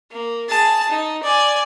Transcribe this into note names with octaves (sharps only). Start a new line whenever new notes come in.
A#3
G#4 A5
D#4
D5 G#5